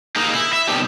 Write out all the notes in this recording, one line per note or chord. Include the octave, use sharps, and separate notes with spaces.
G#3 A#3 D#4
E4
E5
C3 D#3 G3 B3 D4 G4